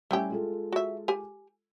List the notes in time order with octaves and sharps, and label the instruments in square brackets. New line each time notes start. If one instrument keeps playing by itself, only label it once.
[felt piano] G3 C#4 G#5 [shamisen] A3 E4 G4
[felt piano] G#3 F4 A4
[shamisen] F#4 E5
G4 G#5